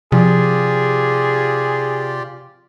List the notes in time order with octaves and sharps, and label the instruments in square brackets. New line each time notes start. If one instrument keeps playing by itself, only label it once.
[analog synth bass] C3 [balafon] F3 [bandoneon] F4 G4 D5 [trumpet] G#4